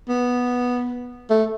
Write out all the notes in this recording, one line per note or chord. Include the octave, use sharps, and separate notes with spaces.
B3
A3